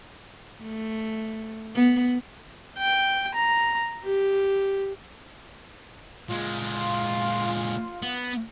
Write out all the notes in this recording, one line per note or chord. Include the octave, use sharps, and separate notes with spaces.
A3
B3
G5
A#5
G4
A#2 G#3 F4
B3